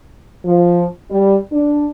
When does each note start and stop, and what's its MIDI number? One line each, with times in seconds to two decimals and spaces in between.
0.45 0.85 53
1.11 1.37 55
1.53 1.89 62